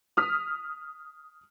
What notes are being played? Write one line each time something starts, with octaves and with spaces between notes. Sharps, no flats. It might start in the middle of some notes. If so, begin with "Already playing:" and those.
D#6 F6 B6